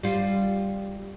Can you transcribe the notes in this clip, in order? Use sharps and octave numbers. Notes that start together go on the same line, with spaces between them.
G3 F4